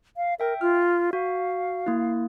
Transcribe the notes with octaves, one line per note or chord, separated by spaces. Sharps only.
F5
A#4 E5 G5
F4 F6
F#4 F5
A#3 E4